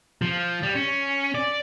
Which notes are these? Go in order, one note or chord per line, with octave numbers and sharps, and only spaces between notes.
F3
G3
C#4
D5